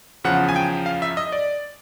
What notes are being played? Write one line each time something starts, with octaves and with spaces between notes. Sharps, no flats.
E2 C#3 F3 F#5
G#5
G5
F5
E5
D#5
D5